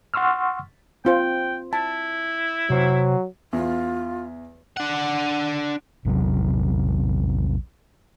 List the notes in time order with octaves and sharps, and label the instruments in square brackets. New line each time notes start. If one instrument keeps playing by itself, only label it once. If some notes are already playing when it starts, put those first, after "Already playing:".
[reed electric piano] F#5 C6 C#6 E6 F6
[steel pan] C4 F4 C5 [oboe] G5
[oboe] E4 [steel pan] A5
[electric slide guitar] C3 C5 F#5 [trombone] F#3
[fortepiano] E2 [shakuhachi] F4
[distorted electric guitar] D4 F#5
[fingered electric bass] A#1 E2 C3 F#3